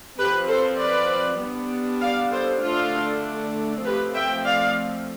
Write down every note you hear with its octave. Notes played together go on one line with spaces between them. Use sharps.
F3 C4 G4 B4
A4 C5
B4 D5
G3 B3 D4
D5 F5
A4 C5
D3 A3 D4 F4 A4
F3 A3 C4 G4 B4
E5 G5
D5 F5